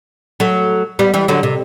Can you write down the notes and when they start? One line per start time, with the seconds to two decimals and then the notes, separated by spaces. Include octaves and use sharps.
0.40 F#3 A3
0.99 G3 B3
1.14 E3 G3
1.28 D3 F#3
1.43 C3